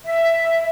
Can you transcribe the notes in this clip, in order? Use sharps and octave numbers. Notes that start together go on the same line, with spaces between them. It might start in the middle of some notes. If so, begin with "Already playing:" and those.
E5